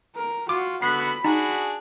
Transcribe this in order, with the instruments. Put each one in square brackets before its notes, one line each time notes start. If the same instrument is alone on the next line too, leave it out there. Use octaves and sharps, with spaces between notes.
[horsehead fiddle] A#4
[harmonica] F4 [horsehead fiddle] F#4 [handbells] D6
[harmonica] D3 B3 F#4 [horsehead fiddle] B5 [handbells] C7
[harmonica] D4 F#4 G#4 [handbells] D#4